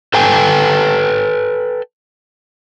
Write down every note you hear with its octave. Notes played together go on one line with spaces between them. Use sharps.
A4 B4 G5 G#5